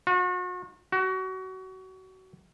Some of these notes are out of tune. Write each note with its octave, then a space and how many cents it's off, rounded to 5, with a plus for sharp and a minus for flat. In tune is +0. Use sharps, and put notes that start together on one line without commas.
F#4 -40
F#4 +25